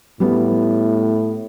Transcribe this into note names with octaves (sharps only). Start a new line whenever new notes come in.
A2 G3 B3